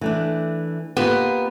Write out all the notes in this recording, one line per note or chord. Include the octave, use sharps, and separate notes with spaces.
E3 A3 D4
A#3 B3 F4 G4